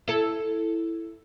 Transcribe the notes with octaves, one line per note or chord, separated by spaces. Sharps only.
E4 A4